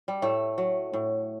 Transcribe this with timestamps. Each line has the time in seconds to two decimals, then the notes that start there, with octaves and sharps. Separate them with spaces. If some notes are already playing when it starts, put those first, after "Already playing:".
0.08 G3
0.22 A2 A3
0.58 F#3
0.93 A2